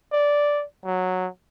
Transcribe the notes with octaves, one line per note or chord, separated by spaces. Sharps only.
D5
F#3